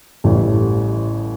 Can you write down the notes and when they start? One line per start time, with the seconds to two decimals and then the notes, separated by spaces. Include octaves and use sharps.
0.24 A1 A2 E3 G3